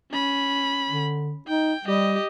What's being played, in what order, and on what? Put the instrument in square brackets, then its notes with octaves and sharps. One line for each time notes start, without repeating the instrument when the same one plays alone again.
[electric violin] C#4 B5
[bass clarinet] D3
[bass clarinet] D#4 [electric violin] G5
[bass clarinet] G3 [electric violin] G4 D#5